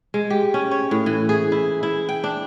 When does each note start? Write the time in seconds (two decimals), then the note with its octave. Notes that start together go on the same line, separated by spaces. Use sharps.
0.14 G#3
0.30 G4
0.54 C#4
0.71 C#5
0.91 A2
1.06 E3
1.29 G#4
1.52 E4
1.83 E4
2.09 G5
2.24 D4